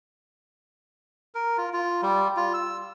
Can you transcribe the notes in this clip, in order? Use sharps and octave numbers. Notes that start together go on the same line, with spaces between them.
A#4
F4
F4
G3
F4
E6